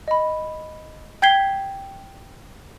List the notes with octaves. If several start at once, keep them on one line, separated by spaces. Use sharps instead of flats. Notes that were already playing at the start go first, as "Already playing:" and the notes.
D#5 B5
G5 G6 G#6 B6 C7 G7